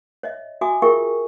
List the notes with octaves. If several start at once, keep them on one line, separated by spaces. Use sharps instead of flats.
C#5 D#5 E5
F#4 E5 G#5 D6 D#6
F4 G#4 A#4 E5 G5 C#6